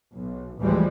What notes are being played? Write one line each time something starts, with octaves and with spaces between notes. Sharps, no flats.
B1
A1 D2 E3 F3 G3 G#3